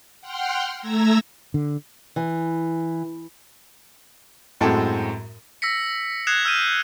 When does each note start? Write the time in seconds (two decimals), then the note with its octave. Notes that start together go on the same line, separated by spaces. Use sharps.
0.20 F#5 G5 C6 F6
0.79 A3 A#5 E6 G#6 A#6
1.54 D3
2.16 E3
4.61 F#2 A2 G#3 C4 F#4 A4
5.62 E6 A#6 B6 C#7
6.27 D#6 F#6 G#6 C7 C#7 E7
6.45 E6 F6 G6 D#7 E7